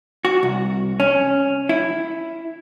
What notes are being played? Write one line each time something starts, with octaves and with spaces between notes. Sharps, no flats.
F#4
C2
C#4
E4